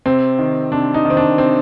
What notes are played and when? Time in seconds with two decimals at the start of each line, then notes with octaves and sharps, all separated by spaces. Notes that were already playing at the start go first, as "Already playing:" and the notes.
0.06 C3 C4
0.39 D#3
0.72 C3 D4
0.94 D#4
1.05 D#3
1.10 C4
1.17 D4
1.38 C3 C4